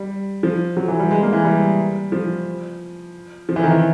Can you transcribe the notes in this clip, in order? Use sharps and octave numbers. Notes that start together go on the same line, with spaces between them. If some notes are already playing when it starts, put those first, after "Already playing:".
Already playing: G3
F3
F#3
E3
G3
G#3
A#3
E3
G3
F3
F3
E3
D#3
E3